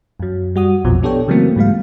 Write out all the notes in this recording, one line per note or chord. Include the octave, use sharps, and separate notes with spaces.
F#2 F#3
G3 F#4 D#6
A#1 F2 B2 F3
B3 D4 G4 A4 C#5 G5
C#3 E3 F#3 A3 A#3 C4
G#2 F#3 G#3 F5